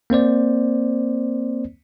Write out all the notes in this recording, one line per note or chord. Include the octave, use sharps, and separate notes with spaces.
A#3 C4 C5 D5